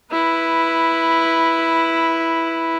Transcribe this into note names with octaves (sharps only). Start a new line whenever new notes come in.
E4 B4